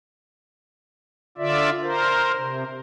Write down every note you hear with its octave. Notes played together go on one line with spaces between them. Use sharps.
D3 F4 D5 E5
A#4 C5
C3